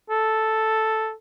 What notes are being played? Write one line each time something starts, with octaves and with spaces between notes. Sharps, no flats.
A4